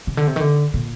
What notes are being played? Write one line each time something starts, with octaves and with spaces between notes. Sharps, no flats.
C3
D3
C3
D#3
D3
A#2